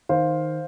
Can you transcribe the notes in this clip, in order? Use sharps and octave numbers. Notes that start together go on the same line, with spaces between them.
D#3 C5 F5